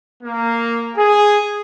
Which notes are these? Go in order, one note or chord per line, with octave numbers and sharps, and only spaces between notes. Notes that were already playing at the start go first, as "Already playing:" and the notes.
A#3
G#4